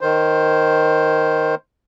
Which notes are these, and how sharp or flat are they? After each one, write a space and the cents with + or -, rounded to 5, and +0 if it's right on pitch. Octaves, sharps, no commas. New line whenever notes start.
D#3 +0 C5 +5